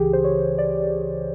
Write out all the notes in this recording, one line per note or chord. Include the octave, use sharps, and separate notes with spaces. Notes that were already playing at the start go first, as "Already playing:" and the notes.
Already playing: C#2 C#3 E3 G4 G#4
C5
C#5
D5